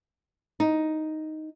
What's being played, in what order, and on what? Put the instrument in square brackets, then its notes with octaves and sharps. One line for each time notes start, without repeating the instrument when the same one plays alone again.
[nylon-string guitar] D#4